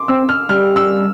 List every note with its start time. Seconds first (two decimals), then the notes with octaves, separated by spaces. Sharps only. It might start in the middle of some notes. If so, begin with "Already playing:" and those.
Already playing: C6 D6
0.08 C4 E6
0.29 F6
0.49 G3 F6
0.76 E6